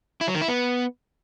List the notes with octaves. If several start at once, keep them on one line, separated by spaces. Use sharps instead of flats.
E4
F#3
D#3
E4
B3